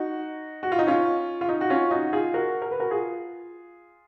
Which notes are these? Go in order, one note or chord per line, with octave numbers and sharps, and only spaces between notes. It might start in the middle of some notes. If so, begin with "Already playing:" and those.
Already playing: D#4 F#4
F#4
F4
D#4
C#4 F4
F4
D#4
F#4
C#4 F4
D#4 F#4
F4 G#4
F#4 A#4
A#4
B4
F#4 A#4
F4 G#4